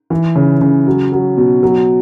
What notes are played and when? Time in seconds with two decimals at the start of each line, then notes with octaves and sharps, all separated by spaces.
0.10 E3
0.36 C#3
0.61 C#3
0.87 F#3
1.12 F#3
1.37 B2
1.63 F#3